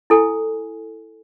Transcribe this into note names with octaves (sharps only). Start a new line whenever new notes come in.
E4 A4 G#5